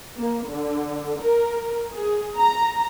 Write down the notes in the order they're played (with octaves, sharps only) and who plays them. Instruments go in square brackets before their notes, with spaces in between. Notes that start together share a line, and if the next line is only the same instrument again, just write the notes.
[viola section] A#3
D3
A#4
G#4
A#5